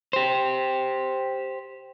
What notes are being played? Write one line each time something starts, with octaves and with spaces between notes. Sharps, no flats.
G4 C5